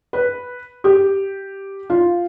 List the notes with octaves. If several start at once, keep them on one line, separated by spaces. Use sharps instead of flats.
B4
G4
F4